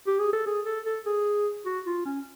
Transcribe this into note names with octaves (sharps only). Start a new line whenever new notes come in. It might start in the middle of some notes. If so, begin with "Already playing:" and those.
G4
G#4
A4
G#4
A4
A4
G#4
F#4
F4
C#4